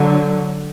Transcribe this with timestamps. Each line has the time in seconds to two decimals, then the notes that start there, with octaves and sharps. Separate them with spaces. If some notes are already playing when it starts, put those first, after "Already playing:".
Already playing: D3 F#3